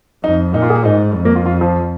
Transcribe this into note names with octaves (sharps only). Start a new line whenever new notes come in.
F2 D#4
A#2 D#4
F4
G#4
G#2 D#4
F2
A#3
F4
F4
F3